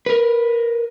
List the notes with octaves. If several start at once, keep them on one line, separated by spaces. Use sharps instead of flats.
A#4 B4